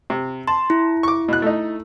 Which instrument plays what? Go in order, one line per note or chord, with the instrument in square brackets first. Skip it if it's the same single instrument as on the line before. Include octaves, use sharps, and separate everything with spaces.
[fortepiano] C3
[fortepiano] A5 [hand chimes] C6
[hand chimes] E4
[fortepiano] C#6 D6
B2 F#6
A3 D#4